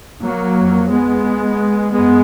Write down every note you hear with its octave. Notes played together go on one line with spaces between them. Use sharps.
F#3 A#3
F2
G#3 B3
F#2 G#3 B3